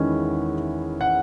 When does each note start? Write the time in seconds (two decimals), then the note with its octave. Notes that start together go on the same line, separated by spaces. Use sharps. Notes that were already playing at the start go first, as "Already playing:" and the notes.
Already playing: E2 D#3 G#3 C#4 E4
1.01 F#5